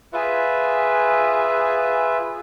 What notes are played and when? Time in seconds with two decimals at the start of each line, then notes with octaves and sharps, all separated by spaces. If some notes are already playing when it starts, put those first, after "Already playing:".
0.13 F4 G#4 B4 E5